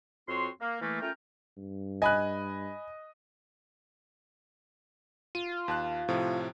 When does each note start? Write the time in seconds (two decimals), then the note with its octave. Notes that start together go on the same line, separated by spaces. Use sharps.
0.28 F2 C4 F#4 C#5 C6
0.60 A#3
0.81 E3 A3 A#3
1.01 A3 C#4 F4 A#4 G5
1.57 G2
2.02 D#5 G#5 B5 F#6
5.35 F4 D#7
5.68 D#2 A5 F#6
6.08 A2 C3 F3